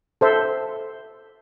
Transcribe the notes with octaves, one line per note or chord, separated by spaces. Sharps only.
A4 C5 E5